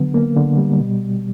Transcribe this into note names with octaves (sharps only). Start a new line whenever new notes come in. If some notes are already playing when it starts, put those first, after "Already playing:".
Already playing: D3 F#3 B3
A#3
D3
G3
B2